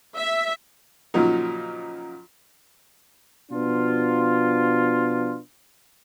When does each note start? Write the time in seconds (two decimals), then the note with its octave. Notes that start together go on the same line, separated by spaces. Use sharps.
0.16 E5
1.14 A#2 C#3 F3 F#3 D#4
3.52 B2 F3 B3 D4 F4